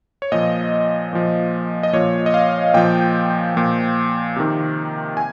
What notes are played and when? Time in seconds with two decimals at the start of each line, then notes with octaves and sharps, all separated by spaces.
0.22 C#5
0.32 A#2 F3 D#5
1.13 A#2 F3
1.83 D#5
1.93 A#2 F3 C#5
2.26 D#5
2.34 F5
2.74 A#2 F3 G5
3.55 A#2 F3
4.36 C3 D#3
5.17 G#5